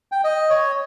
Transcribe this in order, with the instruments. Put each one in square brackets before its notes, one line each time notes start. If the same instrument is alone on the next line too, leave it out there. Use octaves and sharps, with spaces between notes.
[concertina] G5
D#5
C#5